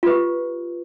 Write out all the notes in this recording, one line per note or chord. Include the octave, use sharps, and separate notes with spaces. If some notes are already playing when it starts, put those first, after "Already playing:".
F4 G4 B4